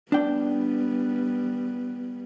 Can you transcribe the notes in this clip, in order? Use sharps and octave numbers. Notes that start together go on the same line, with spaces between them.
G3 B3 D4 G5